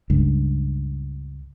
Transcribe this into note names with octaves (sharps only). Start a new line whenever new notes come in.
C#2 G2